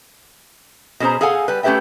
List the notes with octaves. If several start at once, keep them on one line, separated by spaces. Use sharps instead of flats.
B2 C#4 G#4 C5 A#5
G#4 A4 F5 F#5 G#5
G3 B4
A3 C#4 G4 B4 E5 G5